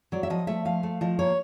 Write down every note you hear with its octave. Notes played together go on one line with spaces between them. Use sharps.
F#3 D5
E5
F3 D#5
A3 E5
F3 F5
A3
F3 D#5
A#3 C#5